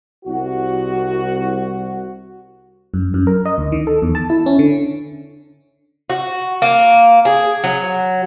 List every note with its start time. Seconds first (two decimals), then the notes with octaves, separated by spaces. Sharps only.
0.25 C2 F#4
2.94 F#2
3.14 F#2
3.27 A#4
3.46 D#5
3.58 D2
3.72 D#3
3.87 A4
4.02 E2
4.15 A5
4.30 E4
4.46 C#4
4.59 D3
6.10 F#4
6.62 A#3
7.25 G#4
7.64 F#3